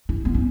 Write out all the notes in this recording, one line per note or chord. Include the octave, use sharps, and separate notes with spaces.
E4
B3
C#4